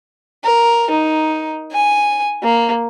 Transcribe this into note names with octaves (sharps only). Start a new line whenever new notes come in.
A#4
D#4
G#5
A#3